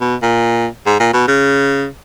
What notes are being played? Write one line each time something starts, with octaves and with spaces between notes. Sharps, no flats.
B2
A#2
G#2
A#2
B2
C#3